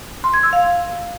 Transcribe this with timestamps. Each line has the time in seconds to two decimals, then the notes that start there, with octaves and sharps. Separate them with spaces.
0.24 C6
0.34 G#6
0.43 E6
0.53 F5